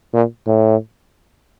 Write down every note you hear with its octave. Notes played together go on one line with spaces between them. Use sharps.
A#2
A2